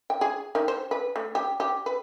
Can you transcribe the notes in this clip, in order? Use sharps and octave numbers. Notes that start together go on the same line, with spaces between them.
G5
G#4
D#3
C5
B4
A3
G4
G4
B4